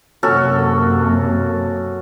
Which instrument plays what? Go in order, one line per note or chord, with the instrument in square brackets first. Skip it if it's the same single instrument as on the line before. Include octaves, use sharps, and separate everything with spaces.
[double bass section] F#2 C3 A#3 [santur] C#4 F#4 A4